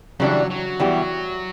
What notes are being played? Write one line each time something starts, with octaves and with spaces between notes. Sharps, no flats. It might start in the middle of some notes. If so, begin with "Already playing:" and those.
C#3 E3 F#3 G3 D4
F#3
E3 G3 B3 E4 G4